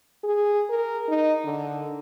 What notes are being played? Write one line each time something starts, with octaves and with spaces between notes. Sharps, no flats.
G#4
A#4
D#4
D3